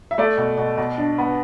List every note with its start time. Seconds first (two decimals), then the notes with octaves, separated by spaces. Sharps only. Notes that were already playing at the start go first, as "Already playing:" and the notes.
0.11 E5
0.18 A3 D5
0.38 B2
0.58 B2
0.77 B2
0.98 D4
1.18 B3